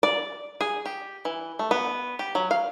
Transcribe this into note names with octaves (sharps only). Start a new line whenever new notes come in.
D5
G#4
G4
E3
A3
B3
G4
F#3
F5